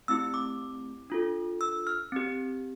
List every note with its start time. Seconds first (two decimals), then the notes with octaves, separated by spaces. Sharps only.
0.08 A3 C4 E4 G4 E6
0.34 D6
1.10 D4 F4 A4
1.61 E6
1.87 F6
2.12 C4 G4